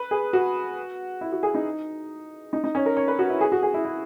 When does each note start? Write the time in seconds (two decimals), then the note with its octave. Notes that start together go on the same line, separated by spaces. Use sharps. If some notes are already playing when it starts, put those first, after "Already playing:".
Already playing: B4
0.11 G#4
0.33 F#4
1.21 E4
1.32 F#4
1.43 G#4
1.54 D#4
2.53 D#4
2.64 D#4
2.75 C#4
2.86 A#4
2.97 C#5
3.08 B4
3.19 F#4
3.30 E4
3.41 G#4
3.52 F#4
3.63 G#4
3.74 E4
3.85 E4